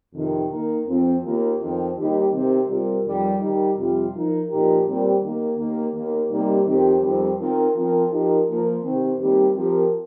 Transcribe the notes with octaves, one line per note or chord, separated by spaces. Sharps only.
F2 C3 D#3
D#3 A#3 D#4 A#4
F2 F3 C4
D#2 D#3 A#3 F4 A#4
F2 D#3 C4 F4
D#2 D#3 G3 D#4 G4
C3 D#3 C4
C3 G3 C4 F4 A#4
F2 D#3 G3
D#3 G3 D#4
F2 C3 G3 C4 F4
F3 D#4 A#4
A#2 F3 D#4 G4 A#4
A#2 G3 C4 G4 A#4
D#2 D#3 A#3
D#2 D#3 A#3
D#2 D#3 A#3
C3 G3 A#3 D#4
F2 D#3 C4 G4
F2 D#3 G3 C4
D#3 C4 F4 A#4
F3 C4 F4 A#4
F3 D#4 G4 A#4
F3 A#3 F4 A#4
C3 D#3 C4
D#2 D#3 G3 C4 G4
F3 C4 G4 A#4